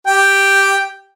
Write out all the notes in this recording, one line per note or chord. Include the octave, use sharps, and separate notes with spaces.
G4 G5